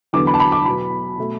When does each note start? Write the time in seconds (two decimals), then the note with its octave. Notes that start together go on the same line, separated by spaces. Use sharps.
0.13 E2 D3 F#3 B3 D6
0.27 B5
0.34 A5
0.40 B5
0.52 D6
0.65 B2 F#3 B3 B5
1.18 B2 A3